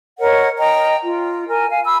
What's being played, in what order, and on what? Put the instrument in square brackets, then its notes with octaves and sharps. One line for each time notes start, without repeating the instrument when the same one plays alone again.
[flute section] A#4 C#5 D#5 F#5
D#5 G5 A#5
F4
A#4 G#5
F5 G#5
B5 E6